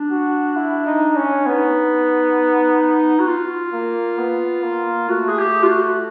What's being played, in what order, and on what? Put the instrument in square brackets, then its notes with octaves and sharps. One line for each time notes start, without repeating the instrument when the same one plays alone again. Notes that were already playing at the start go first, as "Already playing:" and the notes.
Already playing: [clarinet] D4
[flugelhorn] F#4
E4
D#4
C#4
[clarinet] D4
[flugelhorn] B3 [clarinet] D#4
[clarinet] F#4
F4
[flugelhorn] A#3
B3
A#3
[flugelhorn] A3 [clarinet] F#4
[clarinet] G#4
G4
F4
F#4